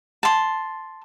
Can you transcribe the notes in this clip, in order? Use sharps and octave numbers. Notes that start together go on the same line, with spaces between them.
A5 C6